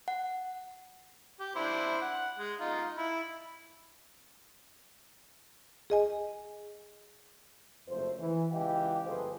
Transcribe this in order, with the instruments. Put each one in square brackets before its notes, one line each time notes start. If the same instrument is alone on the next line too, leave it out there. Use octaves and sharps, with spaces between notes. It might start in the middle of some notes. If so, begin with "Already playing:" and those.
[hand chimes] F#5
[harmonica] G4
D4 E4 C5
F#5
G#3
D#4 F4
E4
[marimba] G#4 D#5 G#5
[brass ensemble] F#1 F2 A3 C5
E3
C#2 E3 G4 D#5 F5 G5
G1 F3 G#4 A4 B4 C5